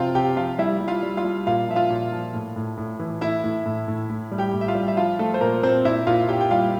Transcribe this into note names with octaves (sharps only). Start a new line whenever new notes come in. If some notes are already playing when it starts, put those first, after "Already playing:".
Already playing: C3 F3 C4 F4 F5 G5
C3 G4 G5
F3 F4 F5
G3 E4 E5
G3
F4 F5
G3
F4 F5
G3
A#2 F4 F5
F3 E5
F4 F5
A#2
F3
A2
A2
A2
E3
A2 E4 E5
A2
A2
A2
A2
G3
G4 G5
A2
E5
F4 F5
G3
E5
F3 F4 F5
F3 A3 A4
C5
A#2 A#3 A#4
A#2 C4 C5
A#2 E4 E5
A#2 F4 F5
A#2 G4 G5
G5
G3 F4 F5